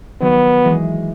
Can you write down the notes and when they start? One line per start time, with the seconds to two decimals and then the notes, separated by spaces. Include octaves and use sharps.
0.21 D#3 F#3 B3
0.64 E3 G#3